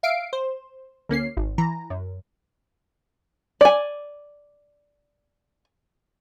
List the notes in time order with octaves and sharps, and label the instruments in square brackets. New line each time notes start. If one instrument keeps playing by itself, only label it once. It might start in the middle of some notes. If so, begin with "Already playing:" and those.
[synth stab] E5 F5 C7 D7
C5
D2 A#3 C#4 C7
G#1
E3 A#5
F#2
[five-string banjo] D5 G#5